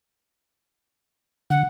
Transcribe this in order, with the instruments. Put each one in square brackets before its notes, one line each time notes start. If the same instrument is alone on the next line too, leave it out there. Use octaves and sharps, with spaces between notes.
[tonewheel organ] D3 [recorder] F#5